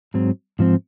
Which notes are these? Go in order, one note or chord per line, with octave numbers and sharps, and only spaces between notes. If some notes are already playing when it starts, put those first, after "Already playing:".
G#2 F#3 C4
G#2 F3 C4